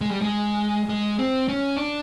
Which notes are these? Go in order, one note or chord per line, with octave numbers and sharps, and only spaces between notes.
G#3
G3
G#3
G#3
C4
C#4
D4